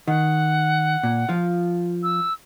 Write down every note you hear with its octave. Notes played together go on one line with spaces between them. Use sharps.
D#3 F#5
A#2
F3 F4
E6